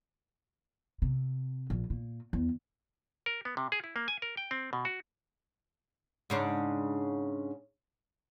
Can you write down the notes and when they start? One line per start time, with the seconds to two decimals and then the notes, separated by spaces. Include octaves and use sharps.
1.02 C3
1.70 A#1
1.90 A#2
2.33 E2
3.26 A#4
3.45 B3
3.57 C3
3.72 G#4
3.84 E4
3.96 A#3
4.08 G#5
4.22 A#4
4.37 G5
4.51 C4
4.73 B2
4.85 F#4
6.30 G#2 C#3 D4